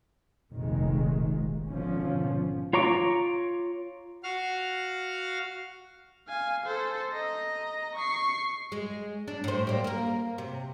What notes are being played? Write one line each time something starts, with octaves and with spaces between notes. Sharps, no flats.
F1 A#1 D#3 G#3
G#1 B2 D3 F3 C#4
F4 C#5 A#5 C#6 D6
F#4 F5 F6
F5 G#5
A4 C5
D#5 A#5
C#6 C7
G#3
D4
A2 C5
G3 A#3
A#3 A#4
C3